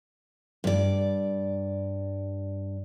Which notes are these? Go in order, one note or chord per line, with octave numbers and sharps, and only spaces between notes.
G2 D5